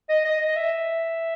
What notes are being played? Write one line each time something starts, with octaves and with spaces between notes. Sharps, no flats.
D#5
D#5
D#5
E5